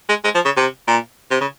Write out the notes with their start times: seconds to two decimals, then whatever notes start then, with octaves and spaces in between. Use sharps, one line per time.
0.09 G#3
0.24 G#3
0.35 F3
0.45 C#3
0.57 C3
0.87 A#2
1.31 C3
1.41 C#3